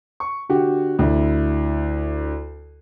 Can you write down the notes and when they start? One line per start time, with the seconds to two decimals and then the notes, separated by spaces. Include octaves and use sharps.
0.20 C#6
0.49 D3 F#4 G4
0.99 D2 E4